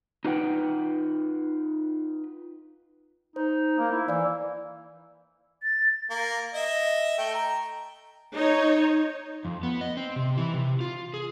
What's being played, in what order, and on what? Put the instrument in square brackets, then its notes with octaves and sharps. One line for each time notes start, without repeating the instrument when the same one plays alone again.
[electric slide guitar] D#4 F4 B4 F#5 G5
[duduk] D#4 [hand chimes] C5
[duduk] A#3
E4
[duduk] E3 [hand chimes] D5 F5 E6
[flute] A6
[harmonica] A#3
D#5 E5
A3 G5
A#5
[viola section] D#4 C#5
[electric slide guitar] F2
B3
D#5
C4
C3
E3
C3
F4
G#4